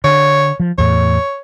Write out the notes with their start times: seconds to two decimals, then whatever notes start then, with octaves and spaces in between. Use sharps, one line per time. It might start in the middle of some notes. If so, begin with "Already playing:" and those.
0.04 D3 C#5
0.60 F3
0.78 E2 A2 C#5